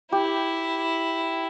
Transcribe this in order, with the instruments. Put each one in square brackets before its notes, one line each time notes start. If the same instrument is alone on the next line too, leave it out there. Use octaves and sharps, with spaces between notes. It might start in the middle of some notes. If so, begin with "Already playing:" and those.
[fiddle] E4 [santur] G4